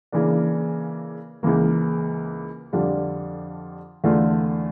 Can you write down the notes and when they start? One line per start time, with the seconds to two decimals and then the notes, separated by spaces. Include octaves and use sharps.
0.12 C#3 E3 A#3 D4
1.43 C#2 C#3 E3 A#3
2.73 F2 D3 G3 D4 F4
4.04 E2 D3 A3 D4 F4